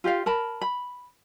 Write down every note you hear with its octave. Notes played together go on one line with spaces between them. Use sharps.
F4 G4 D5 F5
A#4 A5 B5
B5